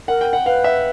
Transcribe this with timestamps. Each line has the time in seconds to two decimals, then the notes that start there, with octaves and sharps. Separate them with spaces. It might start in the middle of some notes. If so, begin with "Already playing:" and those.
0.08 A#4 F#5
0.21 G5
0.33 F#5
0.46 B4 F5
0.64 E5